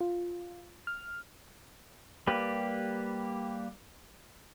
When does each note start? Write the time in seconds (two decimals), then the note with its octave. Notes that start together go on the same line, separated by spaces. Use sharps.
0.01 F4
0.87 F6
2.27 G3 A#3 G4 B4